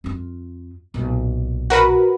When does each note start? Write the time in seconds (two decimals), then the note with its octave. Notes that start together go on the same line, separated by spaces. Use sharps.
0.04 F2 F4
0.94 B1 A#2
1.70 F#4 A#4 B4